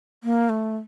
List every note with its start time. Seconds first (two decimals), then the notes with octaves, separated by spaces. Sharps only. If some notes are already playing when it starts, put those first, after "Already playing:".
0.24 A#3
0.49 A3